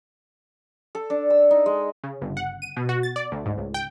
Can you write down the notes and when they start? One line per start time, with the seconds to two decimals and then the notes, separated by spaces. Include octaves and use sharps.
0.95 A4
1.10 D4
1.30 E6
1.51 D#4
1.66 G#3
2.04 C#3
2.22 G1
2.37 F#5
2.62 D#7
2.77 B2
2.89 F#4
3.03 A6
3.16 D5
3.32 D2
3.46 G#2
3.58 C#2
3.74 G5